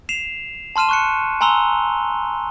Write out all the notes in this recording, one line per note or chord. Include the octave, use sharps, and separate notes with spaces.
C7 E7 F7
A5 C6 F6 D#7 E7
C#6 F#6 C#7
G#5 A#5 C6 E6 F7 G7